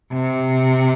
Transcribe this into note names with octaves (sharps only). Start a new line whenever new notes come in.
C3